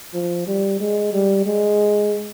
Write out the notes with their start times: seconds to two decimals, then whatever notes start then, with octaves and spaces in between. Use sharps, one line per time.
0.14 F3
0.47 G3
0.80 G#3
1.13 G3
1.46 G#3